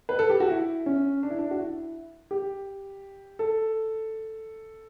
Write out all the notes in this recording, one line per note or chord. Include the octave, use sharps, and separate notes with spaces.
B4
A4
G4
F#4
E4
C#4
D4
E4
D4
F#4
E4
G4
A4